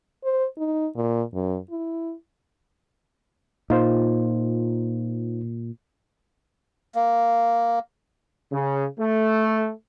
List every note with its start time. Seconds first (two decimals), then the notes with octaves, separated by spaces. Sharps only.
0.24 C5
0.58 D#4
0.96 A#2
1.34 F#2
1.70 E4
3.70 A#2 D#4 F4 C5
6.95 A#3
8.53 C#3
9.00 A3